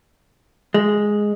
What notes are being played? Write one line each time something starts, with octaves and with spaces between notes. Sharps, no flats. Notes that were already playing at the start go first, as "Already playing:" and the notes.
G#3